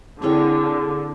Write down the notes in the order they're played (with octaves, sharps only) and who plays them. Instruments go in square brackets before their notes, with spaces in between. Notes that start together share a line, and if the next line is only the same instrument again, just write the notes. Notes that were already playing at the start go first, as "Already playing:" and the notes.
[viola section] D3 [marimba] C4 E4 G5 [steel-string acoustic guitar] G#4 A#4 C#5